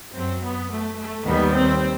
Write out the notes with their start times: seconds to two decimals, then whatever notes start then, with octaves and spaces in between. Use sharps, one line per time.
0.12 F#2 F#3 C4
0.41 B3
0.69 A3
0.97 A3
1.25 D#2 D#3 G3 B3
1.53 C4